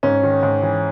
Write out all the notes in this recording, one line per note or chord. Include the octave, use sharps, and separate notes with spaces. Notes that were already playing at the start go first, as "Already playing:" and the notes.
G#2 C#4
D#3
G#2
E3